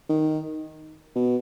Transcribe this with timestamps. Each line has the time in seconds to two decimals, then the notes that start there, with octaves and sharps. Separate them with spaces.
0.09 D#3
1.15 B2